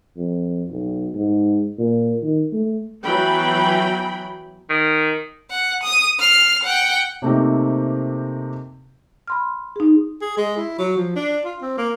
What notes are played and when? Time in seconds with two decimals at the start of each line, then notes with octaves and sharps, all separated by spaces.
0.17 F2
0.70 B1
1.14 G#2
1.79 A#2
2.23 D#3
2.52 A3
3.02 E3 F#3 B3 G5 B5
4.70 D#3
5.51 F#5
5.83 D#6 D#7
6.19 F6 C7
6.63 F#5 G5
7.22 C3 A3 A#3 C4 D#4 G4
9.28 B5 C6 F6
9.76 D#4 G#4
10.21 G#4
10.38 G#3
10.57 E4
10.79 F#3
10.97 F3
11.16 D4
11.45 F4
11.62 C4
11.78 A#3